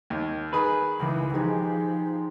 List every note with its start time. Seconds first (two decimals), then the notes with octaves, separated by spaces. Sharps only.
0.10 D#2
0.53 D#3 G#4 B4
1.00 C#2 D#3 E3
1.34 F3 G#3 D#4 G4 G#4